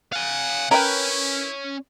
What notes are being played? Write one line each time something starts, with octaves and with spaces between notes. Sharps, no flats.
F5 F#5 G#5
C#4 E4 A#4 B4 G5